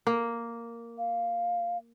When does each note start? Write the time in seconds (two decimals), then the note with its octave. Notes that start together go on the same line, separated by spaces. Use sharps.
0.07 A#3
0.98 F5